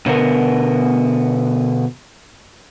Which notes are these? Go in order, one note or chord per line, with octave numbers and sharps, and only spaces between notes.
B2 D3 B3 A#4